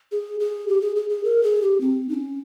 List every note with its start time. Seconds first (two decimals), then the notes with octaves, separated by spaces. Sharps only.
0.12 G#4
0.40 G#4
0.68 G4
0.82 G#4
0.96 G#4
1.10 G#4
1.24 A#4
1.43 G#4
1.62 G4
1.81 C4
2.09 D#4
2.14 C#4